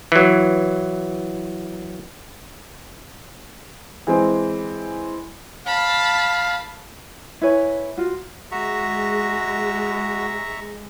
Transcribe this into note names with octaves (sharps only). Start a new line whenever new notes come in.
E3 F#3
E3 G#3 C4
F5 A5 B5
E4 B4 C#5 G#5
F4 F#4
G#3 F#4 E5 A#5 C#6